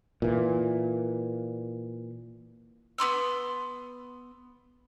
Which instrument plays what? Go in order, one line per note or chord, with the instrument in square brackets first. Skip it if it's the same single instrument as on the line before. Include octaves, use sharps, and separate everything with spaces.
[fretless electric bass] A#2 E3
[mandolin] B3 F#4 C6 E6